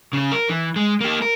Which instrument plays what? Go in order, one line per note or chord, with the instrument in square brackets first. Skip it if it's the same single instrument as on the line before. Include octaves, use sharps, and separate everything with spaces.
[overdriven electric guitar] C#3 C#4
A#4
E3
G#3
A#3 G4
A#4